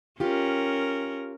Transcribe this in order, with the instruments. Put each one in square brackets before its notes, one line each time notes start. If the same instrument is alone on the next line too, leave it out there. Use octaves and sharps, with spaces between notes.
[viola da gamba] C#4 A#4 [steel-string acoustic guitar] F4 G4